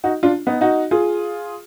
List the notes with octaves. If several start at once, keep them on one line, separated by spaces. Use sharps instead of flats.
D#4 F#4
D4 F4
B3 D#4
D#4 F#4
F4 G#4